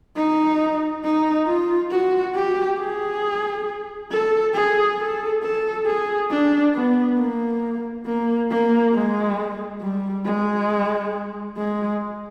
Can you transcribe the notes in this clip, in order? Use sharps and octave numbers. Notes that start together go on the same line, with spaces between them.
D#4
D#4
F4
F#4
G4
G#4
A4
G#4
A4
A4
G#4
D4
B3
A#3
A#3
A#3
G#3
G3
G#3
G#3